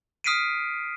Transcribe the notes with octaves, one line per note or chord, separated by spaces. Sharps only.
D#6 F6 B6 C7 D7 D#7